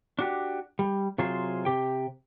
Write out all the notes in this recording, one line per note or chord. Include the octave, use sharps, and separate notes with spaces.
D4 F#4 G4
G3
C3 F#3 F4 G#4 C5
C3 G4 G5